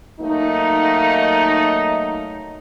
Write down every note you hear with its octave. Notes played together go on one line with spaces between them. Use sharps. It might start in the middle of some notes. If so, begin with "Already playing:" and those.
F#3 A3 A#3 D#4